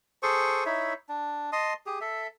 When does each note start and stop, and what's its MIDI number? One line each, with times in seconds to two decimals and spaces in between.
0.23 0.64 68
0.23 0.64 69
0.23 0.64 72
0.23 0.64 85
0.66 0.93 63
0.66 0.93 64
0.66 0.93 73
0.66 0.93 76
1.09 1.50 62
1.52 1.73 75
1.52 1.73 81
1.52 1.73 84
1.52 1.73 87
1.86 1.99 67
1.86 1.99 68
2.01 2.27 69
2.01 2.27 76